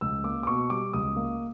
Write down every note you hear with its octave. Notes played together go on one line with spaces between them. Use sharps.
C#2 E6
A#3 D6
D6
B2 C#6
G3 D6
C#2 D#6
A#3